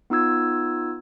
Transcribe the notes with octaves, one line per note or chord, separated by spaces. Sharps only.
B3 D#4 F4 E6 G#6